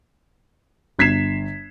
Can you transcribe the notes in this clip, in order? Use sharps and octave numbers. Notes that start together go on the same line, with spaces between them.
G1 G#6 B6 C7 E7